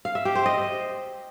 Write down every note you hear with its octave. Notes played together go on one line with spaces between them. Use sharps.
F5
E5
G4
C5
D#5